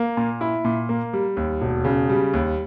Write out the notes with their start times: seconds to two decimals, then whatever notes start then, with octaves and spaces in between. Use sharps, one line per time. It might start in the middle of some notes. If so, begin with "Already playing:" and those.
Already playing: A#3
0.17 A#2
0.41 E4
0.64 A#2
0.89 A#3
1.13 G3
1.37 D#2
1.62 E1
1.85 C#3
2.09 G3
2.34 D#2